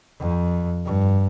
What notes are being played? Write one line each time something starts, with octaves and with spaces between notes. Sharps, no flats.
F2
G2